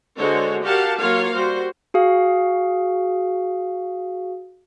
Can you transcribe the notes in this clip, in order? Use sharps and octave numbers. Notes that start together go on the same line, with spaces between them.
D3 G#3 F#4 A4 C5 C#5
F#4 G4 A#4 F5 F#5 A5
F#3 A#3 F4 C#5 F5
G3 F#4 C5
F#4 G#4 F5